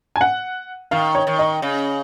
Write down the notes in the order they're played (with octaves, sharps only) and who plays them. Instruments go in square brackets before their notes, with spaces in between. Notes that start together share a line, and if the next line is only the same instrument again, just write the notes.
[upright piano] G#5
F#5
[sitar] D#3 [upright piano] F5
[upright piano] C#5
[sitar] D#3
[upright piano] D#5
[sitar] C#3